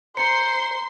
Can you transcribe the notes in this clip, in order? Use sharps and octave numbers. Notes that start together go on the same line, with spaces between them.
C5 A#5 C6 C7 C#7